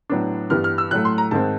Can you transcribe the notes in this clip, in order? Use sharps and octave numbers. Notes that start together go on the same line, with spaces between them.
A2 F#3 B3 D4
G2 E3 G3 B3 F6
F6
E6
A2 F#3 A3 F#6
C6
A#5
G#2 D#3 G#3 C4 A5